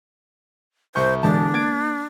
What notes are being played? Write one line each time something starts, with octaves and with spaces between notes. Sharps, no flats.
C2 C5 C#6 G6
E1 D3 E3 G#3 D4 A5
A#3 G#6 A6 D7